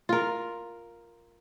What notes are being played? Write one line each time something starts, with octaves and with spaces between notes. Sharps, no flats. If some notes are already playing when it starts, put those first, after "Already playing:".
F4 A#4